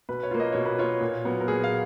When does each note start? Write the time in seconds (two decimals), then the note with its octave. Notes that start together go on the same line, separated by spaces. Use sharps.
0.09 B2 B4
0.23 C#5
0.31 A#3 F4
0.40 D#5
0.52 B2 C#5
0.65 B4
0.79 A#3 F4 C#5
1.01 A#2
1.24 F#3 B3
1.41 A#4
1.48 A#2 G#4
1.64 F5